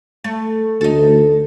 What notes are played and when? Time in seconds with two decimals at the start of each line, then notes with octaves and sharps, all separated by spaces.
0.24 A3
0.81 D2 D#4 A4